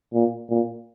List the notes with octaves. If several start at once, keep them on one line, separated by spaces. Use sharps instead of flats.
A#2
A#2